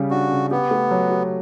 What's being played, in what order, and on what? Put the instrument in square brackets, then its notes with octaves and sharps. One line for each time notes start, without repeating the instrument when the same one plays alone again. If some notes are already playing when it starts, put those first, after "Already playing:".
Already playing: [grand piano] C#3 G3
[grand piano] D4 [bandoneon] F#4
[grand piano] C#3
[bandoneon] B3 [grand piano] G4
[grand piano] A3
F#3
G4